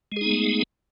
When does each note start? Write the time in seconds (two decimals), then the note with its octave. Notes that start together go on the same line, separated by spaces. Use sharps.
0.12 G#3
0.16 G#4
0.21 D#4
0.26 B3
0.31 A3